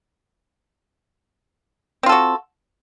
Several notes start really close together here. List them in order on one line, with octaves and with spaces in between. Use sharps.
C4 F4 A4 F#4